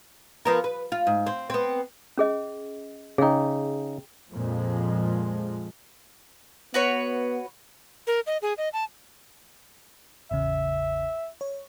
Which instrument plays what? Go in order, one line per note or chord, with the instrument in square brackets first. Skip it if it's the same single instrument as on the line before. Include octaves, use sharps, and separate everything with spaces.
[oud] F3 B3 A#4
B4
F4
G#2
C4
B3 C4
[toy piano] C#4 G#4 D#5
[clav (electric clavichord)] C#3 D#4 [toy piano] G#4 G5
[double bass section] F2 A#2 F3 G#3
[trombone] B3 [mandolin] F#4 B4 C#5
[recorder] A#4
D#5
G#4
D#5
A5
[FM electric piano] A1 E2 C#3 [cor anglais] E5
[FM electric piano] C#5